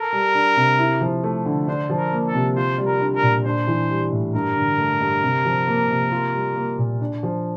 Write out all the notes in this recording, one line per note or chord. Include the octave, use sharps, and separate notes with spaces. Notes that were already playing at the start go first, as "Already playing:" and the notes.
Already playing: A4 A#4
G3
D4
C3
E4
F3
A3
D3
D4 C5
F3
A#4
A#3
A4
C3
F4 C5
G3
A#4
D4
A#4
A#2
D4 C5
E3
G3
A2
G2 A#4
D3
A3
G2
C3
F3
A#3
C3
F4
G3
A#3
A#2
D4
F3